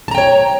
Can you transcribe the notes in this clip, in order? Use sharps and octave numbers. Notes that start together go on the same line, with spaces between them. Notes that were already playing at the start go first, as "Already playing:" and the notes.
C#5 G5 A5 A#5